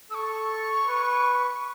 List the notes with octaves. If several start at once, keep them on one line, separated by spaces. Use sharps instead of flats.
A4 C#6 E6
B4